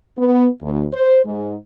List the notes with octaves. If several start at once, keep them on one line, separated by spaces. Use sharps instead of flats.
B3
D2
C5
G#2